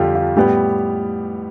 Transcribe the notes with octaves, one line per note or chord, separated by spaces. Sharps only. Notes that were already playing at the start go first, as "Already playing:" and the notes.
Already playing: F2 D3 G3 F4 G4 A4
F4
A2 G3 B3 G4